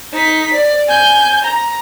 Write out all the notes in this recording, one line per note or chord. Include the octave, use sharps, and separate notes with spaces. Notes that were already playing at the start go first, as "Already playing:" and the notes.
D#4 B6
D5
G#5 G6
A#5